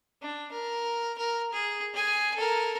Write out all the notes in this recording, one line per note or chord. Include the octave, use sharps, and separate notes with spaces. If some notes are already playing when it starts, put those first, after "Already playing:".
D4
A#4
A#4
G#4
G#4 G#5
A4 A#4